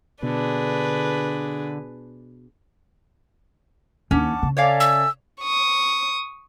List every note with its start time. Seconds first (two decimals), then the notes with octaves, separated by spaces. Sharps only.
0.23 B2 D3 D4 G#4 B4
4.11 D#2 C#4 F#5 A5 D6
4.43 C#3
4.57 A4 C#5 D5 E5 F5 G#5
4.80 E6
5.42 C#6 D#6